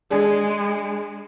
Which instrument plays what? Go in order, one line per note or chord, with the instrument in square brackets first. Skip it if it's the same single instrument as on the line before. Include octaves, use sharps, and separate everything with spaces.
[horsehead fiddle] G#3 [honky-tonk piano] D4 G#4